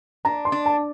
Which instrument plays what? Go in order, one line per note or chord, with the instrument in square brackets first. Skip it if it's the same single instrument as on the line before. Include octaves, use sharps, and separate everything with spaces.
[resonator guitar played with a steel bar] D4 [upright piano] A#5
[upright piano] C6
[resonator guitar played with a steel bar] D4
[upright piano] A5